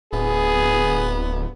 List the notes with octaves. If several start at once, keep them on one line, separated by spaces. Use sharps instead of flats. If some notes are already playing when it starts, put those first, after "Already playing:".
D1 B3 G#4